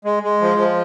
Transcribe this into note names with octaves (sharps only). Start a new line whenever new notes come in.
G#3
G#3
F3
F3